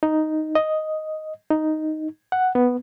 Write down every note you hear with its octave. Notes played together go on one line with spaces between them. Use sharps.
D#4
D#5
D#4
F#5
B3